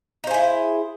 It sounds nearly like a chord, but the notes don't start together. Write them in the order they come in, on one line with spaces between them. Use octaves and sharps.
D#4 C5 G#4 E4